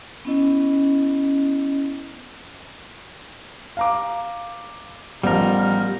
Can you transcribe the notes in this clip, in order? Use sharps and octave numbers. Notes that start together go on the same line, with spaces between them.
B3 C#4 E4 D#5
F5 A#5 D6
A1 F3 G3 B3 A#4